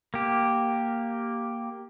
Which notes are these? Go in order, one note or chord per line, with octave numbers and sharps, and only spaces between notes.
A#3 G4